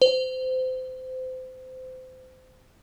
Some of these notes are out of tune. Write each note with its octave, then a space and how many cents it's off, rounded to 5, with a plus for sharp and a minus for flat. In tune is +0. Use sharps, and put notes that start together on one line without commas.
C5 -25